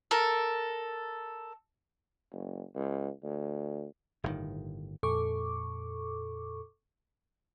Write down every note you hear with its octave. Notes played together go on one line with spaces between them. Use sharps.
A4 A#4
F#1
C#2
D2
G1 A2 C3 D#3
F2 A#2 A4 C#6 D6